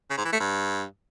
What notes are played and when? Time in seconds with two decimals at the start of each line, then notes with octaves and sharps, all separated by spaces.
0.10 C#3
0.18 G#2
0.25 E3
0.33 A3
0.40 G2